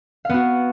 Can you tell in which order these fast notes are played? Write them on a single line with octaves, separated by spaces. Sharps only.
F5 B3 F#4